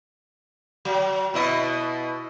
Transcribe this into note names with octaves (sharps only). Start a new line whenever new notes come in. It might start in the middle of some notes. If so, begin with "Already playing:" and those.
F#3
B2 E4 D#5